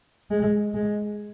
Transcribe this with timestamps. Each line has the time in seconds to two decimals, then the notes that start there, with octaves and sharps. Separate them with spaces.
0.31 G#3
0.74 G#3